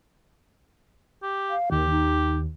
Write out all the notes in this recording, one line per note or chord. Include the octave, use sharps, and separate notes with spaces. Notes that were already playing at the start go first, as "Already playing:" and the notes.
G4
F5
D#2 D#3 G4
D#4